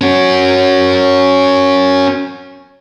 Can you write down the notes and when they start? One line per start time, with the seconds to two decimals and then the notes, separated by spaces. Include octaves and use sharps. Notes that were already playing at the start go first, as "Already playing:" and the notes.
0.01 C#4 F#4